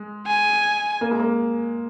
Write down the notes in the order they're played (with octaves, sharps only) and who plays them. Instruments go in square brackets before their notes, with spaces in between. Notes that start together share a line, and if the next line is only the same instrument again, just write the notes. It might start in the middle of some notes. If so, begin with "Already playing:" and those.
Already playing: [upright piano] G#3
[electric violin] G#5
[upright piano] A#3
G#3
A#3